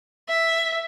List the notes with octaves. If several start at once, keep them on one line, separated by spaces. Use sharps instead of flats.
E5